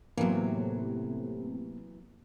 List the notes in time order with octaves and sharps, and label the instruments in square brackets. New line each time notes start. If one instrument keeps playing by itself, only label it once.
[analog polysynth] A2 C3 [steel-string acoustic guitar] E3 F#3 [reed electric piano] A#3 B3